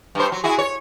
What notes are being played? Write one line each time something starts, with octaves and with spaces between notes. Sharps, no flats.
G2 C5
F#3
E4 F#4 G#4
C#5